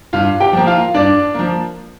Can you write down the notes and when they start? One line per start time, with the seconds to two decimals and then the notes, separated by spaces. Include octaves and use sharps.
0.13 G2 F4 F5
0.40 G4 G5
0.53 F3 A#3
0.67 F4 F5
0.94 G2 D4 D5
1.34 F3 A#3